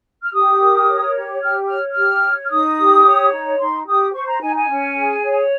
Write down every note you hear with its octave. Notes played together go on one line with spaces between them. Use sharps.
F6
G4 D#6
A#4
C#5
G4
G4 F6
C#5 F6
G4 F6
C#5
F6
D#4 D#6
G4
C#5
D#4
D#4 C6
G4 D#6
C5 C#6
A#5
D#4 G#5
G#5
C#4
G#4
C#5